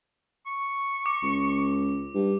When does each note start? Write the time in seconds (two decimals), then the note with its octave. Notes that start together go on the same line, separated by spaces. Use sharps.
0.46 C#6
1.06 D6
1.23 C#2
2.15 G2